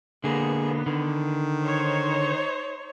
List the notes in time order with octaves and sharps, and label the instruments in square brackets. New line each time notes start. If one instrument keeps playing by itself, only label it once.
[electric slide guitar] D3 A#3 [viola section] B3 [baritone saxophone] G#4
[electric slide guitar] D3 [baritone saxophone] D#3
[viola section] D#4 C5 C#5